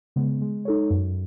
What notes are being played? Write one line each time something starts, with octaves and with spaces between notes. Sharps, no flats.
C#3 G#3 B3
G#3
D#4 A4 C#5
F#2